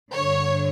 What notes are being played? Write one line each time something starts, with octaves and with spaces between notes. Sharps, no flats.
G2 D3 C#5